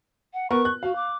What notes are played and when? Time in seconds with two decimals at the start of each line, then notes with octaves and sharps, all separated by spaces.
0.34 F#5
0.51 B3 A#4 C#6
0.65 F#6
0.83 F#4 F5
0.96 D6